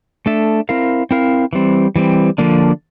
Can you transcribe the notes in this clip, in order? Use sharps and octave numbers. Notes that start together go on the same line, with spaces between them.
A3 D4 A4 E5
C4 E4 A#4 F5
C4 E4 A#4 F5
E3 G3 C4
E3 G3 C4
D3 F3 A#3 D4